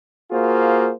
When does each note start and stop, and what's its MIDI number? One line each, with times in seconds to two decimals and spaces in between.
0.31 0.92 58
0.31 0.92 65
0.31 0.92 66
0.31 0.92 68
0.31 0.92 72